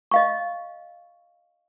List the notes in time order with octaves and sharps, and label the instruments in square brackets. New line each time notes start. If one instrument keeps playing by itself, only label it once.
[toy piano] D#5 F5 C#6